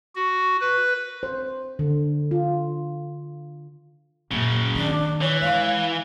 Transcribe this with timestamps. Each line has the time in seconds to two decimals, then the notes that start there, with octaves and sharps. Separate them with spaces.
0.16 F#4
0.61 B4
1.23 C5
1.79 D3
2.31 F4
4.31 F#2 A#2 C#3 A#3
4.75 D#3 D4
5.21 E3 C#5
5.41 G#3 F5